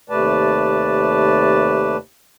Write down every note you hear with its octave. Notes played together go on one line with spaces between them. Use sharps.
D#2 C3 A3 B4 D5 A5